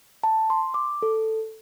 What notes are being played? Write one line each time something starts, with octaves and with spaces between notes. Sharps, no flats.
A5
C6
D6
A4